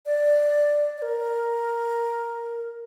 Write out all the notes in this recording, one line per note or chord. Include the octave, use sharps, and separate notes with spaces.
D5
D5
A#4